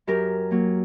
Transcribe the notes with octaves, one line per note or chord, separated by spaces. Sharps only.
F#2 G4 A#4
F#3 A#3